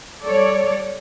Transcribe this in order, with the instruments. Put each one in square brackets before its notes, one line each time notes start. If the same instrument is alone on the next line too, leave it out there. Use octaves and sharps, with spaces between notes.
[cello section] G3 A4 C#5 D5